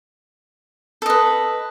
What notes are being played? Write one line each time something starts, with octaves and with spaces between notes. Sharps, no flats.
A4 B4 D#5